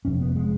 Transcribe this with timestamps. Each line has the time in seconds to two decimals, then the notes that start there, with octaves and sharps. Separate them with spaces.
0.05 F1 F2 C3 C#4
0.21 B3
0.36 G#3